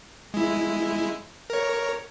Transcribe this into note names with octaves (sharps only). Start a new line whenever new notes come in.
G#3 E4
A#4 C#5